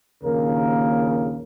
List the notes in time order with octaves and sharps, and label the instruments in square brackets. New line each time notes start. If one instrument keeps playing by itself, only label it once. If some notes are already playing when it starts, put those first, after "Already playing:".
[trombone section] A#1 D#2 C#3 A#3 A#4